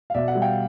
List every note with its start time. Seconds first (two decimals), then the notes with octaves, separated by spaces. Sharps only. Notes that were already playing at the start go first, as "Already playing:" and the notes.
0.10 F5
0.14 B2 D5 E5
0.28 E5 F#5
0.35 G3
0.42 F5 G5